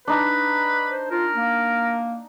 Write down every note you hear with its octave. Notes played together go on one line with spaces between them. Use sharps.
D4 D#4 B4
C5
F4 A#4
A#3